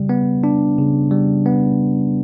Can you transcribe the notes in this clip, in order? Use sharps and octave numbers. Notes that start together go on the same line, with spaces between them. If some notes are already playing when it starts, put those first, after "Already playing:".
Already playing: C#3 G3
B3
D4
C#3
G3
B3